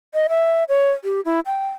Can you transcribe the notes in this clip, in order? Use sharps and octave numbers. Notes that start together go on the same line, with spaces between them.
D#5
E5
C#5
G4
E4
G5